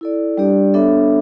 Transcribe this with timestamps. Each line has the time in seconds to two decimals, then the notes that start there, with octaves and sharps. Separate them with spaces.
0.01 E4 A4 D5
0.37 G3 D4 G4 D5
0.74 B3 D4 A4 C#5 E5